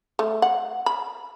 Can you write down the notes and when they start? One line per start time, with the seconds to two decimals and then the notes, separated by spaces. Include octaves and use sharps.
0.19 A3
0.42 F#5
0.86 B5